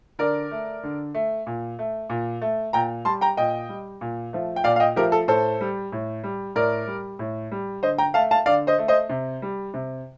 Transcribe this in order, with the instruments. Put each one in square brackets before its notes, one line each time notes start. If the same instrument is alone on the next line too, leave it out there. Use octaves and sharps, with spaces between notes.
[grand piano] D3 A#4 D5
A3
D3
A3
A#2
A3
A#2
A3
A#2 G5 A#5
G3 A5 C6
G5 A#5
A#2 D#5 G5
G3
A#2
F3 A3
G5
A#2 D5 F5
F5
D#5 G5
F3 A3 G4 A#4
A4
A2 A4 C5
G3
A2
G3
A2 A#4 D5
G3
A2
G3
D3 C5 D#5
G5 A#5
A3 F5 A5
F5 A5
D3 D5 F5
C5 D#5
A3
C5 D#5
C3
G3
C3